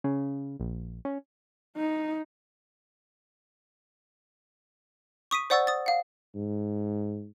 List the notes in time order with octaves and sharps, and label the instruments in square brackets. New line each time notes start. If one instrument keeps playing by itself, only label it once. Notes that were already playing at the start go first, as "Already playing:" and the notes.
[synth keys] C#3
A#1
C#4
[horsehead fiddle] D#4
[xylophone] C#6 D#6 B6 D#7
C5 D5 F#5 C#6 E6 A6
D#6 A6
F5 F#5
[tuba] G#2